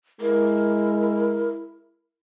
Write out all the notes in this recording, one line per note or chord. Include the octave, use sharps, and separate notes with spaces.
G#3 E4 A#4